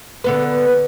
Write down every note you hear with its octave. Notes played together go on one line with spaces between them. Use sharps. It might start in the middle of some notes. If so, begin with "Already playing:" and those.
D3 B3 B4